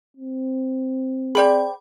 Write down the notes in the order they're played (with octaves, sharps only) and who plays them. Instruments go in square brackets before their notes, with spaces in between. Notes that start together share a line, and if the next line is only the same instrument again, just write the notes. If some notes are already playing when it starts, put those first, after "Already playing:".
[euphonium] C4
[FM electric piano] G#4 D5 [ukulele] C5 G5 B5